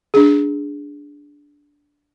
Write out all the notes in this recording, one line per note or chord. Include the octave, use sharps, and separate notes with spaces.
D4 G#4